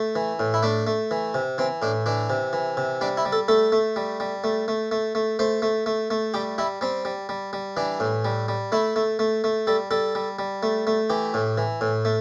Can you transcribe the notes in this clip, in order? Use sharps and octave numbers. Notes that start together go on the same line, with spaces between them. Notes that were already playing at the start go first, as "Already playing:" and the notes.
Already playing: A3
E3
A2
E4
A3 D4
A3
E3
C3
E3 C4
A2 D4
E3 D4
C3
E3
C3
G3 D4
E4
G3
A4
A3 A4
A3
G3
G3
A3
A3
A3
A3
A3 C5
A3
A3
A3
G3 G4
G3 E4
G3 C4
G3
G3
G3
E3 D4
A2
G3
G3
A3 E4
A3
A3
A3
G3 A4
G3 A4
G3
G3
A3
A3
E3 G4
A2
E3
A2
A3